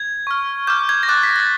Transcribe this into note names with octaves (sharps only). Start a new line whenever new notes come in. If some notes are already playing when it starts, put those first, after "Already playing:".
Already playing: G#6
C#6 F6
D6 F6 G6
G#6
A#6
D6 F#6 A6
B6
A6